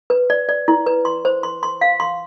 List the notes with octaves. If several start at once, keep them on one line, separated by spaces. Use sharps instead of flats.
B4
D5
D5
E4
B4
C6
C5
C6
C6
F5
C6